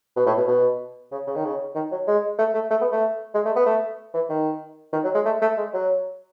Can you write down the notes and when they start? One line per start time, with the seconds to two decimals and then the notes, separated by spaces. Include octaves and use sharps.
0.16 B2
0.26 A2
0.38 B2
0.48 B2
1.12 C#3
1.27 C#3
1.36 D#3
1.45 C#3
1.75 D#3
1.92 F#3
2.07 G#3
2.39 A3
2.54 A3
2.70 A3
2.81 B3
2.92 A3
3.35 G#3
3.45 A3
3.56 B3
3.66 A3
4.14 E3
4.29 D#3
4.93 D#3
5.04 F#3
5.15 G#3
5.25 A3
5.42 A3
5.57 G#3
5.74 F#3